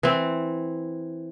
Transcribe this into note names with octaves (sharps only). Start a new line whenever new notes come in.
E3 C4